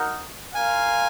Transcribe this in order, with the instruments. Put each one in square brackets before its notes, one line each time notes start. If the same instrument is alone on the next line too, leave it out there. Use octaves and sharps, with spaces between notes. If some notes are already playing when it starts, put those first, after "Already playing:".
Already playing: [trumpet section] A#3 D#4 F#4 A#4
[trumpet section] F4 A#4 F5 [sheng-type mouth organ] G#5